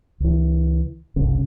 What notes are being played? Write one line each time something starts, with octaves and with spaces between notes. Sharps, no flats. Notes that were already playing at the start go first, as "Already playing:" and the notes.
C#2 E3
F#1 C2 G2 C#3